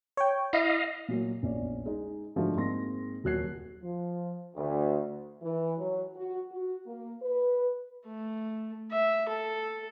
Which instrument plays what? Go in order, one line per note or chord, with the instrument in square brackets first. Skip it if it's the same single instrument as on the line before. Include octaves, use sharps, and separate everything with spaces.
[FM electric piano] C#5 G5
[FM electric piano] E4 [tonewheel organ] D#5 F5
[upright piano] A#2 F#3 A#3
A#1 E2 C#4 D5
G#3 D#4
G#2 D3 F3 G#3 A3 F#4
G#2 A#3 C4 C6 A#6
D#1 F#3 F#4 F#6 G#6 C7
[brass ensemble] F3
D2
[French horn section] E3
F#3
F#4
F#4
A#3
B4
[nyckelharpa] A3
E5
A4